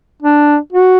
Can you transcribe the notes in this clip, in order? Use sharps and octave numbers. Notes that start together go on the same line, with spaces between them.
D4
F#4